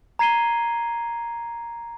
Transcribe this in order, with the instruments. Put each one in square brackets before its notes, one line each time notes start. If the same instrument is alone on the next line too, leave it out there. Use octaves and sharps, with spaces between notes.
[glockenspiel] A#5 G#6 C7 D#7 G7